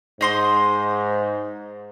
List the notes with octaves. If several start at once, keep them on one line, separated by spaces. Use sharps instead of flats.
G#2 D#4 C5 D#5